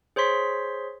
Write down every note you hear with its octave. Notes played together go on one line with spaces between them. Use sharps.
G#4 C5 C#5 C6 B6